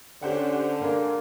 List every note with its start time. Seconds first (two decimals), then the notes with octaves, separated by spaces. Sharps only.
0.23 D3 C#4 D4 G4 C5 F#5
0.80 A#2 G#3 A#3 A#4